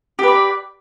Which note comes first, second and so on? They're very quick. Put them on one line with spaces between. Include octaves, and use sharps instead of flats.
G4 B4 D5 B5